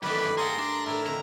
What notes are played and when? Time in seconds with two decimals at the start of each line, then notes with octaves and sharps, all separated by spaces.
0.03 F#2 D#3 E3 A3 B4 D5 B5
0.24 G2
0.37 G#4 A4 D5 F5 F#5 A#5 C6
0.58 D4
0.86 A2 E3 E4 A#4
1.06 F2 D3 D#3 A#5